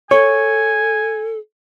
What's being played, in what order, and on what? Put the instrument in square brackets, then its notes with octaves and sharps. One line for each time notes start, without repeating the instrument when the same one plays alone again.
[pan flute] A4 [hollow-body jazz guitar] C#5 [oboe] G#5